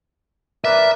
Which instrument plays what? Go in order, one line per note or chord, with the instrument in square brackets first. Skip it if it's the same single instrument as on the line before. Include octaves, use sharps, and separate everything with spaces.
[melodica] A#4 B4 D5 [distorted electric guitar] E5